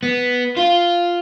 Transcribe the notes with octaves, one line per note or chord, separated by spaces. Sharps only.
B3
F4